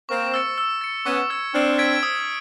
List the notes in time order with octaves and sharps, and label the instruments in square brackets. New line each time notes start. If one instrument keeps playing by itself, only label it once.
[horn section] A#3 C4 [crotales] C#6
[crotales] E6 A6 C#7
E6
A6 C#7
[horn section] B3 C#4 [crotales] C#6
[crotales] E6 G#6
[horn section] C4 D4 [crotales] F6
[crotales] G#6 B6 D7
D#6